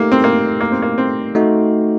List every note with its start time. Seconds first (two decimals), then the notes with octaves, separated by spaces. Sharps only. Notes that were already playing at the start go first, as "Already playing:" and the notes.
Already playing: A3 A#3 D#4 G4 A#4
0.12 C4
0.24 A#3
0.60 A#3
0.72 C4
0.82 A#3
0.98 C4
1.35 A3 D#4 F#4